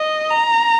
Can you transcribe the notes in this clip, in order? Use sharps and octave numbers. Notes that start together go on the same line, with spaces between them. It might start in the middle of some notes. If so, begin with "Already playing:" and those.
Already playing: D#5
A#5